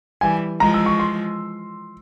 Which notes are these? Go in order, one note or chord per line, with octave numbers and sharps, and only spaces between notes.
E3 G3 G#5
F3 G#3 A#5
E6
C#6
C6